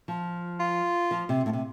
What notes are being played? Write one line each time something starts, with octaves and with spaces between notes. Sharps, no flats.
F3
F4
F3
C3
A2
C3